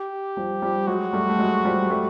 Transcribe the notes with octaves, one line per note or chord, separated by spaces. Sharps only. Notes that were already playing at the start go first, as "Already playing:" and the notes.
Already playing: G4
F3 G3
F3 G3
F#3 G#3 F#4
G3 A3
A3
F#3 G#3
F3 G3
G3 A3